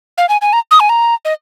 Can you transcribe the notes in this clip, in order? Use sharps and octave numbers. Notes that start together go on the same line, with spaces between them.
F5
G#5
G#5
A#5
D#6
G#5
A#5
D#5